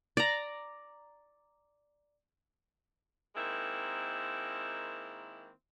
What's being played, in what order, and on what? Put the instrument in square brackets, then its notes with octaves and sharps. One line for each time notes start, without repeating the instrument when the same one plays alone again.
[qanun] D5 A#5
[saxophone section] D#3 G#3 A#3 C4 E4